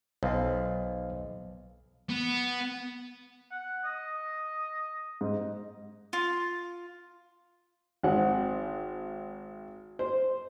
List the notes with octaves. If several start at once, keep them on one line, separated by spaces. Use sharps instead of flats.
B1 C5 D#5 F5
B3
F#5
D#5
G#2
F4
G#1 C4 F#5
C5